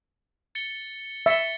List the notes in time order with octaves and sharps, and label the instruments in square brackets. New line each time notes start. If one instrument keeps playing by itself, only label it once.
[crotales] A6 C#7 G7
[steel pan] E5 [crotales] A6 C#7 G7